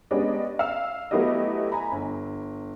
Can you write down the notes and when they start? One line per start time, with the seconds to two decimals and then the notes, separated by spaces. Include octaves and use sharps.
0.11 G#3 B3 C#4 D4 G4 D#5
0.59 F5 E6
1.11 F#3 A3 B3 E4 G4 D#5
1.72 G#5 A#5 B5
1.92 G1